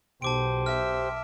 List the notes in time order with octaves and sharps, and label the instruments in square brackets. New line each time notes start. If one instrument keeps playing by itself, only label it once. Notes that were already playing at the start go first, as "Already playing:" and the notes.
[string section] B1 [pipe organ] G4 C5 [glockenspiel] A5 D6 D7
[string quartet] E5 [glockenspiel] F6